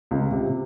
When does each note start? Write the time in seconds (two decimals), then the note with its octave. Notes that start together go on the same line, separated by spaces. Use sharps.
0.11 C#2 C#3
0.31 C3
0.49 C3